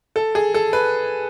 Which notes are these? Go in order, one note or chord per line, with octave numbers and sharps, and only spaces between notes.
A4
G#4
A4
B4